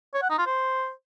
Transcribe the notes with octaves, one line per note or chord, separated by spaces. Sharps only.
C#5
F#5
D#4
F4
C5